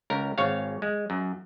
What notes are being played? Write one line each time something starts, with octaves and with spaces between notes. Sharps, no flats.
C#2 A#4
G#1 C#5 F5
G#3
F#2